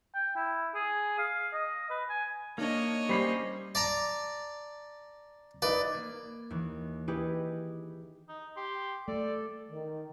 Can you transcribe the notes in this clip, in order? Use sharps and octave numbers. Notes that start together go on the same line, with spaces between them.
G5
E4
G#4
F5
D#5
B4
G#5
A#3 D4 D#4 C#5 D#5
G3 C#4 G4 C5 B5 C7
D5 A5 A#5
D#4 B4 D5
A#3 G#6
D#2 E3
D#4 E4 G4 G#4 B4
D#4
G4 C6
A3 A4 D5
D#3